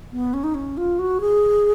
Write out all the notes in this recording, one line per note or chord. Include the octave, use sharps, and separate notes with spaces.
B3
C#4
D#4
C#4
F4
F#4
G#4